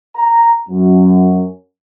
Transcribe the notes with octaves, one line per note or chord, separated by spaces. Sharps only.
A#5
F#2